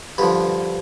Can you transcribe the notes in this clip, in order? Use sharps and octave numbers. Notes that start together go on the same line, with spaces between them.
G2 D3 F3 B4